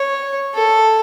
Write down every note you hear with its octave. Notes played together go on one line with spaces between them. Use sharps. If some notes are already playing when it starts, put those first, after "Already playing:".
Already playing: C#5
A4